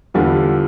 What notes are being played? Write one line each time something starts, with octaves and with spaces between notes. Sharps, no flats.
E2 D3 G3 B3 F4